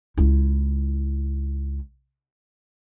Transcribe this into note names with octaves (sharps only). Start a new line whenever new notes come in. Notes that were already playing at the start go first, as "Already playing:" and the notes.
C#2 E4